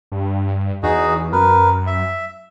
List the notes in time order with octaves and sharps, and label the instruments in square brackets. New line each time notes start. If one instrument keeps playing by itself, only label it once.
[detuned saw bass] G2
[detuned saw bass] E2 [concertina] D#4 F#4 G#4
[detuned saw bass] F#2 [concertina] A#4 B4
[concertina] E5